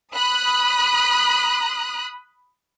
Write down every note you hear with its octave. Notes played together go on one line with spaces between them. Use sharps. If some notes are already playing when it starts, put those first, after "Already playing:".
B5 D#6 F#6